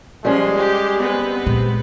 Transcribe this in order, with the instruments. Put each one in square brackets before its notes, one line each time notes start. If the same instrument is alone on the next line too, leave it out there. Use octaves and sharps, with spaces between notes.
[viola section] F3 C6 [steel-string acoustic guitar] G3 C#4 [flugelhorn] G#3
[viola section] G4
B3 C4 B4
[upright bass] A#2 G#3